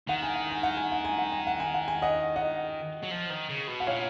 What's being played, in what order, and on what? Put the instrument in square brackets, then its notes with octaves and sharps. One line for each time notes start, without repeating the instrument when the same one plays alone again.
[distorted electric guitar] D#3 [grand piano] F#5
[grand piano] G#5
F#5
G#5
F#5
G#5
F#5
G#5
F#5
G#5
F#5
G#5
F#5
G#5
D#5 F#5
D#5 F#5
[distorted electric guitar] F#3
F3
D#3
C#3
B2
[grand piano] F#5
[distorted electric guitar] A#2 [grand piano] C#5 F5